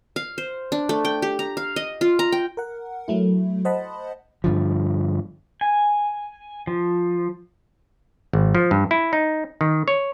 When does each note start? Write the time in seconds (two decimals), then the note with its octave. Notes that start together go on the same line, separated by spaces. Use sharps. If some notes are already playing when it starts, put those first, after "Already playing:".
0.16 F5
0.38 C5
0.72 D4
0.89 A3
1.05 G5
1.22 G4
1.39 A#5
1.57 F5
1.76 D#5
2.01 F4
2.19 A#5
2.32 G5
2.57 A#4 F#5
3.08 F#3 A3 E4
3.65 C5 D#5 F#5 A5 B5
4.44 G2 D3 F3
5.61 G#5
6.67 F3
8.33 G#1
8.55 F3
8.71 G2
8.91 E4
9.13 D#4
9.61 D#3
9.88 C#5